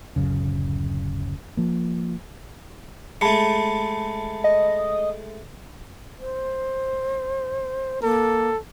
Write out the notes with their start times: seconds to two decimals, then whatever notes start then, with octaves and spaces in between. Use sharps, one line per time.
0.16 D1 F#2 C#3
1.57 F3 A#3
3.21 G#3 A3 A5 B5 C#7
4.44 D#5
6.19 C5
8.03 A#3 A4